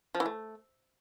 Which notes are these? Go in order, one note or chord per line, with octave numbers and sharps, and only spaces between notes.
F3
E3
A3